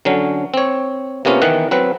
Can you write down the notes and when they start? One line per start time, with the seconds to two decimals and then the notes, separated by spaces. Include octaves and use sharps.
0.05 D3 F#3 C#4
0.54 C4 C#5
1.25 C3 A#3 B3 C#4 F4
1.42 D#3 E3 B3 F#5
1.71 F#3 C4 B4